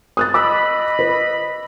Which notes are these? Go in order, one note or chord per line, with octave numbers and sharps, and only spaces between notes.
D#6 F#6 A6
D#5 B5 D6 E6
B4